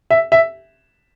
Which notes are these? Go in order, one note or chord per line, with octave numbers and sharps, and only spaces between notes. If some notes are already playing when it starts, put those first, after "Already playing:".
E5
E5